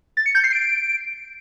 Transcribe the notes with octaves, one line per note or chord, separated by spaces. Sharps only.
A6
C#7
G6
C7
D7